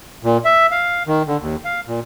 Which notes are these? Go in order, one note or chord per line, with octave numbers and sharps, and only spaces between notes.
A#2
E5
F5
D#3
D3
D#2
F5
A#2